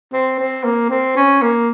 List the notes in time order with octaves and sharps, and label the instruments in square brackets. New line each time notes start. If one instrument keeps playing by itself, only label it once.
[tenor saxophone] C4
C4
A#3
C4
C#4
A#3